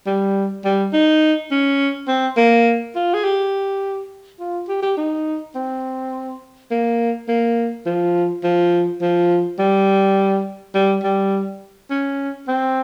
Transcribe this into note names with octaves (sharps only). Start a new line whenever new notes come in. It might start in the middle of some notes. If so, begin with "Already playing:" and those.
G3
G3
D#4
C#4
C4
A#3
F4
G#4
G4
F4
G4
G4
D#4
C4
A#3
A#3
F3
F3
F3
G3
G3
G3
C#4
C4